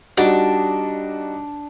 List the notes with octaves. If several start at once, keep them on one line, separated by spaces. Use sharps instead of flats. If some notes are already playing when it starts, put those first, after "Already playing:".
G3 D4 D#4 F#4